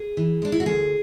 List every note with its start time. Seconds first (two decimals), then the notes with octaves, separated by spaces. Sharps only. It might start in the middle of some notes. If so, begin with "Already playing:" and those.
Already playing: G#4
0.17 E3
0.42 G#3 D4
0.52 E4
0.60 F#4
0.66 D2 G#4